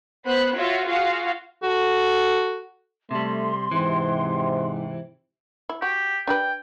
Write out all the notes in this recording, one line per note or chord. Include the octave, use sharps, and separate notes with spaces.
B3 C5 B5 F#6
F4 F#4 C#5 E5
F4 F#4 G#4 F5
F#4 A4
C3 G3 A3 C6
G#2 C3 E3
E4
F#4 G4
D4 G4 B4 G5